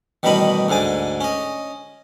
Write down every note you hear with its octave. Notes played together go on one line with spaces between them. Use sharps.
A1 B2 D#3 G3 D#5 B5
D2 G#2 D3 G#5 D6
C#4 D#5